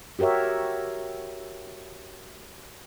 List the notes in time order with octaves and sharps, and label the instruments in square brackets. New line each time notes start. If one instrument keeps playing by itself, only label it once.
[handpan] F#4 G4 A#4 C#5 E5